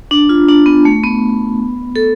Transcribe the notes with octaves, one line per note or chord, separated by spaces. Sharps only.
D4
F4
D4
B3
A3
B3
A4